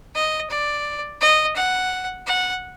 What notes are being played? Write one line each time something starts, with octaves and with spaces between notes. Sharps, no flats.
D#5
D5
D#5
F#5
F#5